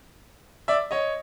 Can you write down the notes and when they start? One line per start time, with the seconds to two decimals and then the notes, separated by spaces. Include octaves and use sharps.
0.68 D5 E5
0.91 C#5 D#5